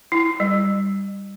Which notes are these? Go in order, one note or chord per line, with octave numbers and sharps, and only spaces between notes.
E4
G3